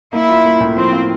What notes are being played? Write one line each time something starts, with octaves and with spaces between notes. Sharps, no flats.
A#3 E4
F4
A#3
A2
F3 C4
F4